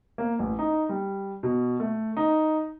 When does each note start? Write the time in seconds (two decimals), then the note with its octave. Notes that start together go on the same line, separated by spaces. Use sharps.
0.18 A#3
0.39 A1
0.59 D#4
0.89 G3
1.43 B2
1.80 A3
2.17 D#4